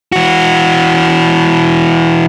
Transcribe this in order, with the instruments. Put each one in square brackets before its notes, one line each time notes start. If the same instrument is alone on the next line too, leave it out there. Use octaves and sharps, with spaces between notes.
[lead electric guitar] E3 F#4